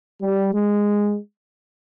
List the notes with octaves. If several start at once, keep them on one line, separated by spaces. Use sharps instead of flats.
G3
G#3